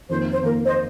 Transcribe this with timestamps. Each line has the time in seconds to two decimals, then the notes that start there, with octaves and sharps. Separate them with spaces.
0.09 F2 D#3 A#3 C5
0.32 C5
0.42 F2 D#3 A#3 A#4
0.65 C5 D#5